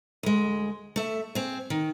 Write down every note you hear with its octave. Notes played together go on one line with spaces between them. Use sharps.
D2 G#3
A3 E5
C4 G#4
D#3